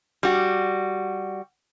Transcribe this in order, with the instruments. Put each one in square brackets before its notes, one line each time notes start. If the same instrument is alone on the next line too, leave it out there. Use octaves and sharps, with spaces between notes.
[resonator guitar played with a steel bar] G3 F#4